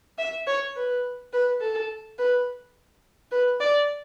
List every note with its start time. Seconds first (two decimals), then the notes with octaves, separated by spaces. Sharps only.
0.18 E5
0.47 C#5
0.76 B4
1.33 B4
1.61 A4
2.19 B4
3.32 B4
3.60 D5